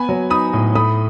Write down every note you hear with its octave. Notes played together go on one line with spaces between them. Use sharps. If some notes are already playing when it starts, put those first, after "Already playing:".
Already playing: B3 G#5 B5
F#3
D#4 B5 D#6
A2
A3 B5 D#6